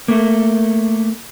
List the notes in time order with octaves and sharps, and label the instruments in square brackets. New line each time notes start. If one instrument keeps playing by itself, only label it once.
[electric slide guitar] A3 A#3